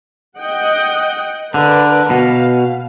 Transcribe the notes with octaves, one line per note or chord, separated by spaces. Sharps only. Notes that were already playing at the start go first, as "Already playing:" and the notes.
D#5 F#5 G5
D3 A#4 B4 D5
B2 F5